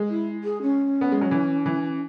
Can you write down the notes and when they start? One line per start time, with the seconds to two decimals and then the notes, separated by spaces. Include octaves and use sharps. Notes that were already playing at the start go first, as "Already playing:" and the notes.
Already playing: G#3
0.10 E4
0.44 G#4
0.62 C#4
1.01 B3
1.12 G#3
1.21 F#3
1.31 E3
1.66 E3